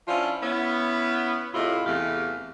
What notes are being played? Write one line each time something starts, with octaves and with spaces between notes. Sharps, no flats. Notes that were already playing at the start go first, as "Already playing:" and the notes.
F3 C#4 D4 E4 F4
B3 C#4 E4
A2 C3 G#3 E4 F4
E2 C3 E3 A3 G4 F5